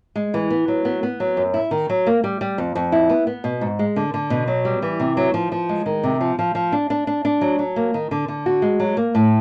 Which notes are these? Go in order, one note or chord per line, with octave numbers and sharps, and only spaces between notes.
G#3
E3
B3
F#3
B3
B3
F#3
F#2
E4
D#3
F#3
A#3
G3
G3
F2
F2
E4
B3
B3
B2
G#2
G#3
D3
D3
B2
F#3
G3
E3
C3
F#3
F3
F3
G#3
D#3
C3
F3
F3
F3
D4
D4
D4
D4
F#3
F#3
A#3
D#3
D3
D3
F#4
G#3
F#3
A#3
A2